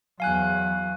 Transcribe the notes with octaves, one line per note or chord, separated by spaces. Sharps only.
E2 F#3 F5 G#5 F#6